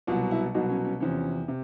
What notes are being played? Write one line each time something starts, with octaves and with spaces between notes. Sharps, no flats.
C2 B2 F#3 F4
E4
C2 B2 F#3 D#4
C#4
C#4
E2 C3 F3 C#4
C3